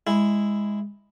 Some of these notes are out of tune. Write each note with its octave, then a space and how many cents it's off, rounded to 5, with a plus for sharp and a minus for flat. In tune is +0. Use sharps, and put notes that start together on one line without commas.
G#3 -10 E4 +0